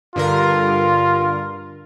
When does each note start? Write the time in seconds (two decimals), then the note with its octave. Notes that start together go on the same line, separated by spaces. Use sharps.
0.16 G2 D3 F4 A#4